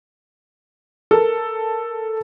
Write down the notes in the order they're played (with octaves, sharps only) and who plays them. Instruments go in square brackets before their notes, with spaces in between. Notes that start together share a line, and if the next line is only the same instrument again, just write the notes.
[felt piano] A4 A#4